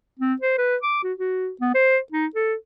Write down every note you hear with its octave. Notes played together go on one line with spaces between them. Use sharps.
C4
C5
B4
D6
F#4
F#4
B3
C5
D#4
A4